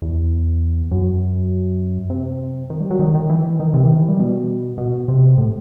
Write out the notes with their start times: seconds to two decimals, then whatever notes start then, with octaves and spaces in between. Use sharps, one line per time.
0.02 E2
0.91 F#2
2.10 C3
2.70 D#3
2.81 G3
2.90 F#3
2.99 D#3
3.14 D#3
3.29 E3
3.60 D#3
3.74 C3
3.83 E3
3.88 D#3
3.99 E3
4.09 G3
4.19 B2
4.78 B2
5.08 C3
5.37 A2